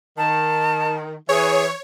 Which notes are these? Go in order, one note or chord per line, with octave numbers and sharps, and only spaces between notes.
D#3 A5
E3 G#4 C#5